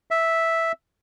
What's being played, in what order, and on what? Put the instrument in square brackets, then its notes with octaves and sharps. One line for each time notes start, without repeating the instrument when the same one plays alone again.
[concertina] E5